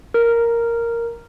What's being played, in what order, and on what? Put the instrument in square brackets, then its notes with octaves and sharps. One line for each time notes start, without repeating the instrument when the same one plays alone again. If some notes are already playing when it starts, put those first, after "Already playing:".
[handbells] A#4